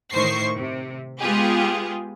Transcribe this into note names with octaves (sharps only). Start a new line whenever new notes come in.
A2 D#3 C5 C#6 C7
C3
G#3 B3 F4 G4 G#4